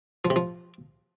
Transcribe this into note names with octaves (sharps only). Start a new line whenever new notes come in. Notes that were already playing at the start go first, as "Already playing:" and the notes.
F3
C3
F3